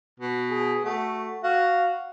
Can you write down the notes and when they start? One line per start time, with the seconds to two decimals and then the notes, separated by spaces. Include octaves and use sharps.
0.20 B2
0.51 G#4
0.84 A3 F#4
1.44 F#4 F5